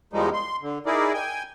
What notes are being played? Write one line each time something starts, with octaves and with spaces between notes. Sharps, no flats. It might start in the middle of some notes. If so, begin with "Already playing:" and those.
E2 D#3 F3 G3 G#3 D#4
C6
D3
D#4 E4 G#4 A#4 D5
G5 G#5